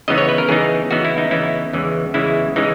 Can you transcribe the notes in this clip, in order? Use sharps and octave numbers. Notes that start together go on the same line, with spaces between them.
C#3 E3 B3 D#4 D#5
C#5
B4
A#4
C#3 E3 B3 D#4 G#4
C#3 E3 B3 D#4 F#4
E4
D#4
C#3 E3 B3 D#4 E4
E2 C#3 E3 G#3
E2 C#3 E3 G#3 E4
C#3 E3 G#3 D#4